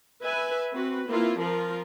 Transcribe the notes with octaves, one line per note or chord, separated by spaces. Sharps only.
B4 E5 G#5
C4 F#4 B4
A#3 C4 E4 F4
F3 F4 A#4